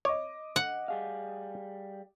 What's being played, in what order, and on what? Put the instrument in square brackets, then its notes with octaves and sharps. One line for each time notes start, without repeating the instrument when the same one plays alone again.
[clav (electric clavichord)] C#5 [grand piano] D#5 D6
[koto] F#5
[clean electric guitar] G3 G#4 F5